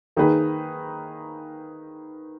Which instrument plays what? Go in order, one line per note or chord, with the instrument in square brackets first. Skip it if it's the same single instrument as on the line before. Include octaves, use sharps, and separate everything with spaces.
[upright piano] D#3 A#3 D#4 G#4 B4